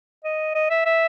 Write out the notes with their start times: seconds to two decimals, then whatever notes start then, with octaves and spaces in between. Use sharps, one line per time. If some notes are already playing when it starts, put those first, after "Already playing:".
0.24 D#5
0.55 D#5
0.70 E5
0.85 E5